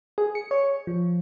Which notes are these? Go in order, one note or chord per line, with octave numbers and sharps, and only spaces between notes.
G#4
C#7
C#5
F3